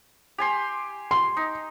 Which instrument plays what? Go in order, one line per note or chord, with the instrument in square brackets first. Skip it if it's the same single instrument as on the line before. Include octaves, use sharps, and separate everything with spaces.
[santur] G4 G#5 C6
[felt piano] C6
[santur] D#4